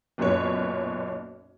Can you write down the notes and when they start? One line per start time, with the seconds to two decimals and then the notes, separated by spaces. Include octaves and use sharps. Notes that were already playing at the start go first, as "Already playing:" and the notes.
0.18 F#1 B1 F#2 A#2 B4 C#5